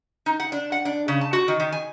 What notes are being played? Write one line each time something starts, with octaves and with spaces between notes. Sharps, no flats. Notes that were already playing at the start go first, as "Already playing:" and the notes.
D#4
F#5
D4
F#5
D4
C#3
A5
F#4
D#3
D#3
G#5